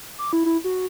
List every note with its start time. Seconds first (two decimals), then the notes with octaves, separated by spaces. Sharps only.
0.19 D6
0.33 E4
0.46 E4
0.64 F#4